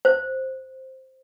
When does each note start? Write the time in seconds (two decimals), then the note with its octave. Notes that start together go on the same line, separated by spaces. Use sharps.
0.05 C5